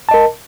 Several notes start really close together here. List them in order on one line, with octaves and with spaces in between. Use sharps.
A5 D#5 A#4